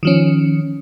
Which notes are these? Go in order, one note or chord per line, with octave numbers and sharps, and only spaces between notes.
D#3 F3 C#4